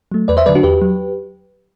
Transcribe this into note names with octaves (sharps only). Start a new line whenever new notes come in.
F#3 A3
E2 B4 D5
C5 E5
D3 F#3 B4 D5
D4 F#4
E2 G4 B4
F#3